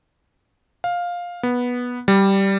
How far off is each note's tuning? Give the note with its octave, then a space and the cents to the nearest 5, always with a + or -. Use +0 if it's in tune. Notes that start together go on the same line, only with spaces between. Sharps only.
F5 +10
B3 -10
G3 -5